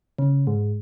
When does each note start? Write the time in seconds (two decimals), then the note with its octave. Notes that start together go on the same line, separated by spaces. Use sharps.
0.19 C#3
0.47 G#2